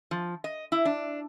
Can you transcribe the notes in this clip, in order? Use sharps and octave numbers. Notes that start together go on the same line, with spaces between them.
F3
D#5
E4
D4